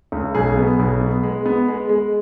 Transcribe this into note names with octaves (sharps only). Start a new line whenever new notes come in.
C#2
B1 G#4
B3
B1
B3
G#3
B3
G#3
G#3